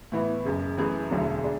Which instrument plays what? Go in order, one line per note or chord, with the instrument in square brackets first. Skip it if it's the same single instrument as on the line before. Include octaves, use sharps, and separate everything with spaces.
[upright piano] A2 E3 B3 E4
F#1 F#2 C#3
F#2 E3 A3 E4 G#4
E1 D2 D3 F#3
G#3 D4